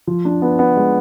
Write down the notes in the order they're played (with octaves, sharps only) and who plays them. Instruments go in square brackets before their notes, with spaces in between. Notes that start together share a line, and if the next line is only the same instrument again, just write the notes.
[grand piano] F3
D4
B3
B3
G#3